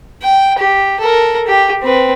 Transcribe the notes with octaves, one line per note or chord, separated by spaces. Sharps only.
G5
G4
A4 A#4
G4
C4 B4